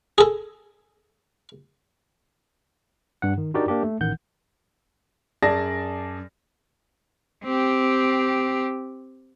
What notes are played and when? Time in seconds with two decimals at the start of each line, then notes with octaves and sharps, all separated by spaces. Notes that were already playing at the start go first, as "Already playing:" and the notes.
0.18 G#4 A4
3.22 G2 F#5
3.38 D#3
3.54 D4 D#4 F#4 G4 A#4 D5
3.68 A#3 D4 G4
3.83 A3
4.00 A1 D#3 F#5 G6
5.42 F#2 G#4 D5 A5 A#6
7.44 C4 G4